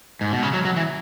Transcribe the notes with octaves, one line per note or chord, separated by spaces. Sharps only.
G#2
B2
C#3
F#3
F#3
E3